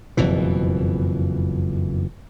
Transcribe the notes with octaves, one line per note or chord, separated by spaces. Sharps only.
F#1 F2 B2 E3